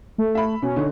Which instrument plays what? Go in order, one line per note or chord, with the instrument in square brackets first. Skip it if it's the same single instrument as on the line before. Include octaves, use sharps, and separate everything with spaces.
[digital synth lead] A3
[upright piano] E5 B5
[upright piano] B2 [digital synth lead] C#4
[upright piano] D3 D#4